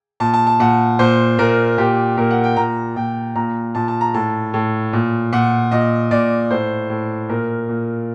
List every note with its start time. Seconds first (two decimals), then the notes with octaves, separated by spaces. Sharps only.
0.20 A#2 A5
0.34 A5
0.47 A5
0.60 A#2 F#5
0.99 A#2 C5
1.38 A#2 A#4
1.78 A#2 G4
2.17 A#2 A#4
2.31 F#5
2.44 G5
2.57 A#2 A#5
2.96 A#2 G5
3.35 A#2 A#5
3.75 A#2 A5
3.88 A5
4.01 A#5
4.14 A2 A5
4.54 A2
4.93 A#2
5.32 A#2 F#5
5.71 A#2 D#5
6.11 A#2 D5
6.50 A2 C5
6.90 A2
7.29 A#2 A#4
7.69 A#2